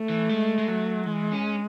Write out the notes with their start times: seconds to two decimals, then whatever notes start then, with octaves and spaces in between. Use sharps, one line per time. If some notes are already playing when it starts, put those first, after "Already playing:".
Already playing: A3
0.09 E3
0.29 G#3
0.58 G#3
0.68 F#3
1.06 E3 G#3
1.32 C#4